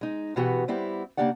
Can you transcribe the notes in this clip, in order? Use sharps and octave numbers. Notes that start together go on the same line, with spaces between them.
G#3 D#4
B2 E3 B3 F#4 G4
G3 B3 C4 E4 G4
C#3 A#3 D4 G4 D5 F#5